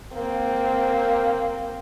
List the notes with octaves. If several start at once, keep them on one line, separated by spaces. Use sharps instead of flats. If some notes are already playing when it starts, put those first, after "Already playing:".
A#3 C4